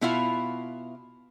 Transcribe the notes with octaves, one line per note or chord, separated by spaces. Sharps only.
B2 B3 E4 F4 E5 F5